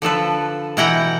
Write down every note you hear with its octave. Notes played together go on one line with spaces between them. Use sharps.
D3 F3 A4 B4
B2 E3 E4 F#5 G5 A#5